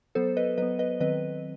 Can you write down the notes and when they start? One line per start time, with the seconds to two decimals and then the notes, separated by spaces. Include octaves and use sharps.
0.15 F#3 B3 A4 C5
0.37 B4 D#5
0.57 F#3 B3 B4 D#5
0.79 B4 D#5
1.00 D#3 F#3 C4 B4 D#5